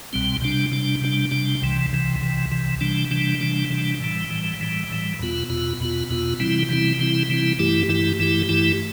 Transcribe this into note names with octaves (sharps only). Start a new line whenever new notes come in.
C2 B2 G3 C4
C3 G3 D4
C3 G3 D4
C3 G3 D4
C3 G3 D4
C2 C3 E3
C2 C3 E3
C2 C3 E3
C2 C3 E3
C3 E3 G3 D4
C3 E3 G3 D4
C3 E3 G3 D4
C3 E3 G3 D4
A2 E3 G3
A2 E3 G3
A2 E3 G3
A2 E3 G3
E2 B2 B3 F4
E2 B2 B3 F4
E2 B2 B3 F4
E2 B2 B3 F4
C3 E3 G3 C4 E4
C3 E3 G3 C4 E4
C3 E3 G3 C4 E4
C3 E3 G3 C4 E4
G2 E3 A3 E4 G4
G2 E3 A3 E4 G4
G2 E3 A3 E4 G4
G2 E3 A3 E4 G4